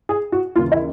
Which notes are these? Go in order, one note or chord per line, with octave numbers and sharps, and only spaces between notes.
G#4
F#4
D#2 C#3 E3 F4
E4